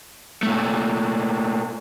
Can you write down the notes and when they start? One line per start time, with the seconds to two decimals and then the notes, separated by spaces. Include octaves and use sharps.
0.43 A#2 A3